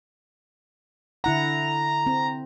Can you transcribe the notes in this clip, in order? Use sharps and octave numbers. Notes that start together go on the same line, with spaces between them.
D3 E4 F#5 A#5
C4